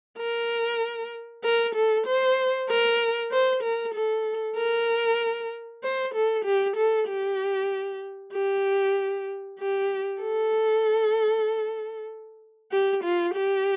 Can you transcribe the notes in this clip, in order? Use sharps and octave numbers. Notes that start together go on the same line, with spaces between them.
A#4
A#4
A4
C5
A#4
C5
A#4
A4
A#4
C5
A4
G4
A4
G4
G4
G4
A4
G4
F4
G4